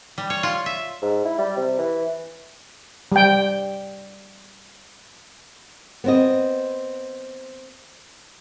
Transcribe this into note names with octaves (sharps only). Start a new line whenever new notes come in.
G3
C#5
F4
E5
G#2
E4
G3
C3
E3
G3 G5
B3 C4 D#5